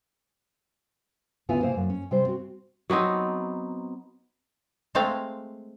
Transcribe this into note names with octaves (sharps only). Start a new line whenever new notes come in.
D2 C#3 B3 E4 F4 G#5
C3 A#3 C5
F#2
C#4
C3 G3 C5
C4 F#4
F#3 B3 C4 D#4
G#3 A3 C4 F5